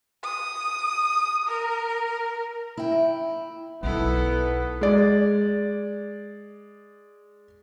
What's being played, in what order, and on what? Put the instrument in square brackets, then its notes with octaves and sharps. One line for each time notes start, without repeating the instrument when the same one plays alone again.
[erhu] D#6
A#4
[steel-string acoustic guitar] E4 G5
[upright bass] B1 [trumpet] B3 [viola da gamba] E4 A4
[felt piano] G#3 D5